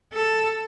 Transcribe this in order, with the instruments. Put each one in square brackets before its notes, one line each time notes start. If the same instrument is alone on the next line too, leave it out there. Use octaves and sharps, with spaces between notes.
[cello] A4